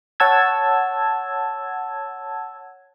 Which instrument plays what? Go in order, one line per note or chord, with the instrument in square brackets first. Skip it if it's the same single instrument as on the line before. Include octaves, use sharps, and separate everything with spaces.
[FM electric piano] C#5 F#5 A5 E6 G#6